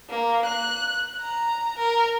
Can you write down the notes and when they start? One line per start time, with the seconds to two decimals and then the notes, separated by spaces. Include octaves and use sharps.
0.10 A#3
0.46 F#6
1.21 A#5
1.79 A#4